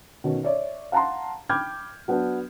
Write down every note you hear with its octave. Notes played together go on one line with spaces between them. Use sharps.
B2 D#3 C#4
C#5 D5 E5
F5 F#5 A5 A#5 C6
G5 B5 D6 F6 G6 G#6
F#3 B3 D4